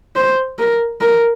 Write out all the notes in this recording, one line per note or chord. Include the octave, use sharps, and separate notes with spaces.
C5
A#4
A#4